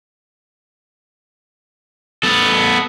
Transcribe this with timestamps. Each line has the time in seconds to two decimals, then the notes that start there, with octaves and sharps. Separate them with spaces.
2.23 B3 A4